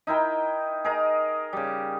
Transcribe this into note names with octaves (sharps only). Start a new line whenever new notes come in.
D#4 E4 A#4 G5
G#4 A#4 D#5
C#3 G3